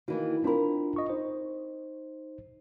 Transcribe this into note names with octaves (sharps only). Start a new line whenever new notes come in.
D#3 E3 A#3 D#4 F#4
C4 D4 F4 A#4 B5
D#5 C#6
D#4 C5